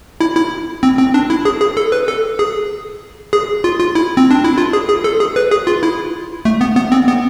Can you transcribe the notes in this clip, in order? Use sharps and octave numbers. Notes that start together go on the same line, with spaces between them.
E4
E4
C4
C4
D4
E4
G#4
G#4
A4
B4
A4
G#4
G#4
F4
F4
E4
C4
D4
E4
F4
G#4
G#4
A4
G#4
B4
G#4
F4
E4
A3
B3
B3
C4
B3